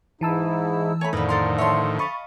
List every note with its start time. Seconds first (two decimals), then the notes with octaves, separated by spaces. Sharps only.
0.21 G#2 E3 D#4 E4 A5 E6
1.01 A3 C#5 G#5 A#5 B5
1.13 F2 A2 D3 D#3 F3 B4 B5
1.29 A4 A#4 C6
1.58 C#5 E5 A5 C6
1.99 D#5 F5 B5 C#6 A6